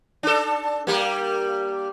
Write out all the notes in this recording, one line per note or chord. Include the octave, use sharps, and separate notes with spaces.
D4 A4
G3 A#3